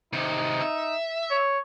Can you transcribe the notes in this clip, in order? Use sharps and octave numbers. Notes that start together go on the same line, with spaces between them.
C3 D#3 D#4
E5
C#5